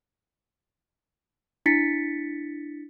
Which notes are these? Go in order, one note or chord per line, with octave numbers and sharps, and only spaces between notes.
D4 E4 A6 B6 C#7